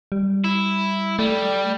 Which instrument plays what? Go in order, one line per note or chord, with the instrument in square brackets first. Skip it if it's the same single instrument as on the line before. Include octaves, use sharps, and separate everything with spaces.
[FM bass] G3
[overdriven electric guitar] E4
[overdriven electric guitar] G3 [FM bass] A3